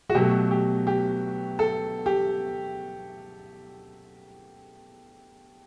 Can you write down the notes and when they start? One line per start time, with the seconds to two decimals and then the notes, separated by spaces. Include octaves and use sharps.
0.09 F#4
0.15 B2 F#3 A3 G4
0.51 G4
0.87 G4
1.59 A4
2.06 G4